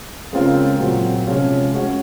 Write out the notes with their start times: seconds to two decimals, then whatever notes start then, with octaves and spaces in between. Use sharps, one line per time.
0.33 C#3 G#3 C4 F4 A#4
0.80 A#2 F#3 C4 F#4
1.27 C3 F3 G#3 C#4 F4
1.74 G#3 C#4 F#4 C#5